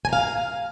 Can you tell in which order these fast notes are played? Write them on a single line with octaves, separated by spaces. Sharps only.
G#5 A#5 F5